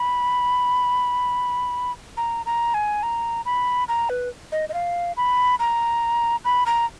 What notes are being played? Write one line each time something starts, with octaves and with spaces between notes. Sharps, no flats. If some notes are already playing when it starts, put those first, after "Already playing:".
Already playing: B5
A#5
A#5
G#5
A#5
B5
A#5
B4
D#5
D#5
F5
B5
A#5
B5
A#5